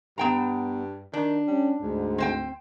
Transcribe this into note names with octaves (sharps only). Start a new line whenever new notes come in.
G2 B3 G5 A#5
D#3 D4
G3 C#4
D2 G#2
C4 C5 G5